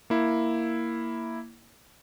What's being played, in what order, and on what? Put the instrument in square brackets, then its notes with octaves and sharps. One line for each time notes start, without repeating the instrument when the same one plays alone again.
[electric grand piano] A#3 E4